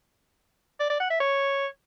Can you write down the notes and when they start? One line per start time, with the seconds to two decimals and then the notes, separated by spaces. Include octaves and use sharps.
0.80 D5
0.90 D5
1.00 F#5
1.10 E5
1.20 C#5